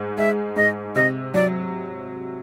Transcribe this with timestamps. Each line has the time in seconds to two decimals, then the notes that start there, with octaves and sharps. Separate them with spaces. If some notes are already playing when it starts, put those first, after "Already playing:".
Already playing: G#2
0.18 G#3 E5
0.56 G#2 D#5
0.95 C3 D#5
1.34 F#3 D5